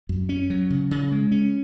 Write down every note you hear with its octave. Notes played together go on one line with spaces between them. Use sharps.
F#2
C#4
F#3
C#3
C#3
G#3
C#4